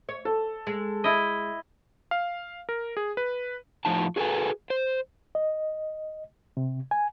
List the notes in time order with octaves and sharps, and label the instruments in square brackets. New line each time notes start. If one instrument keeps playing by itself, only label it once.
[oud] C#5
[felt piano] A4
[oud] G#3
[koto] E4 D#5
[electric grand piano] F5
A#4
G#4
B4
[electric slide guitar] F2 A2 F3 D#4 A5
F#4 G#4 A4 B4 G#5
C5
[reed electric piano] D#5
C3
G#5